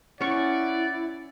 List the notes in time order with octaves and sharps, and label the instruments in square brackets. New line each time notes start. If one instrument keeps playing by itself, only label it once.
[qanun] C#4 C#6 [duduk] E4 [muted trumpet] D5 [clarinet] F#5